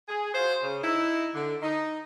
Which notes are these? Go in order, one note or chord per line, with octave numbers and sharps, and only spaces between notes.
G#4
F4 F#4 C5
C#3
D#4 E4
D3
D#4